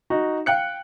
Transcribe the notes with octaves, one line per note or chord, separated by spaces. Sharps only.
D#4 F#4
F5 G5 F#6 C#7